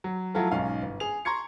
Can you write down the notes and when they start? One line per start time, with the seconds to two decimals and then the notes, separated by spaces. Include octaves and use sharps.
0.04 F#3
0.34 F3 F#3 A3 E4 F4 A4
0.51 B1 G#2 C#4 F5
0.82 G1
1.00 G#4 F7
1.25 A#5 C6 C#6 G#6 C#7